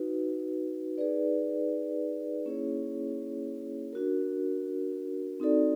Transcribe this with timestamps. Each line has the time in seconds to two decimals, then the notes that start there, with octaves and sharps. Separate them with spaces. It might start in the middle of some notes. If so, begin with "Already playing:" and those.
Already playing: D#4 F#4 B4
0.98 D#4 G#4 B4 D5
2.45 A#3 C#4 E4 G#4 C#5
3.93 D4 F#4 A#4
5.40 C4 D#4 F#4 A4 D5